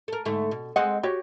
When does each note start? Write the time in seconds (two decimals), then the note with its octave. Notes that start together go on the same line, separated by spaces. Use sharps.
0.08 A4 A#4
0.25 G#2 D3 A3
0.51 B2
0.76 G#3 C4 D#5 F#5
1.03 F#4 G4 C#5